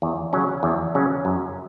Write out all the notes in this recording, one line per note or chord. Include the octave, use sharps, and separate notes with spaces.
E2
C#3 F#3 C#4
E2
C#3 F#3 C#4
F#2